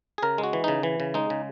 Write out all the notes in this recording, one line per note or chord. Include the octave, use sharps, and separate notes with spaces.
G#4
C#3 A#4
G#3
F#4
E3
C#3 D#4
E3
C#3
G#3 D#4
C#3